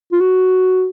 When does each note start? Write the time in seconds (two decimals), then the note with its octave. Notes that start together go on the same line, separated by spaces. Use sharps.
0.12 F4
0.21 F#4